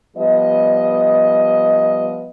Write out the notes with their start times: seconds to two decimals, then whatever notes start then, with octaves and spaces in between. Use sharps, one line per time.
0.16 F3 G3 B3 D#5